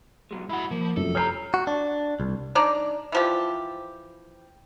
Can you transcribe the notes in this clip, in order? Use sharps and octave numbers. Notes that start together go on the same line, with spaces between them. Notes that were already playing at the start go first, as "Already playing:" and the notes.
B2 F#3 G#3
G#3 E4 F#4 F#5
F3 A#3
F1 F#2 F3 A4
C#5 A5 A#5 F6 G6 C7
F#4
D4
C2
D4 D#4 D5 A#5
E3 F3 G4